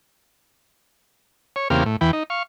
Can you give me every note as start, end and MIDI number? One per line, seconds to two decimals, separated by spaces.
1.56 1.68 73
1.70 1.84 40
1.70 1.84 49
1.70 1.84 58
1.70 1.84 60
1.70 1.84 67
1.70 1.84 77
1.85 1.96 45
2.01 2.11 40
2.01 2.11 52
2.01 2.11 71
2.01 2.11 79
2.13 2.23 63
2.30 2.43 77
2.30 2.43 85